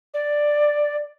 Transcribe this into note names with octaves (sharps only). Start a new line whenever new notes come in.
D5